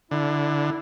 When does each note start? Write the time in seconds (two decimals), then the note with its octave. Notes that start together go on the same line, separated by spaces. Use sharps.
0.11 D3 E4